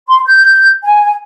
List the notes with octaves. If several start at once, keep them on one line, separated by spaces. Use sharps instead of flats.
C6
G6
G#5